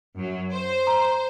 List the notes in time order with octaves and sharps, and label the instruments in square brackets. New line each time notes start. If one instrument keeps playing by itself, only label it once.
[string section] F#2 F#3
C5
[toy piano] A#5